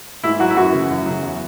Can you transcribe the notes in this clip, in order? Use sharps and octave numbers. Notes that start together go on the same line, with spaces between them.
G#2 E4
F#3 F#4
E4
F#2 F#4
C#3 E3
F#2
C#3 F#3
E2